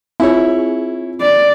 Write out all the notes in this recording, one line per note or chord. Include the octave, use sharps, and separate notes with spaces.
C4 E4 F4 G#4 C#5
D5